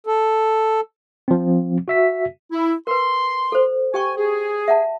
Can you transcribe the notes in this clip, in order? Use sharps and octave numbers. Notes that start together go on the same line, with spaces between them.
A4
F3 C4
F#4 E5 B6
E4
A#4 B4 C6
A4 C5
G4 G5 G#5 C#6
G#4
E5 F#5 A5